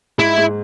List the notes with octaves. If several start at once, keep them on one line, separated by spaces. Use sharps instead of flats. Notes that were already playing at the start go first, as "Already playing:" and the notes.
G#2 E4
G#2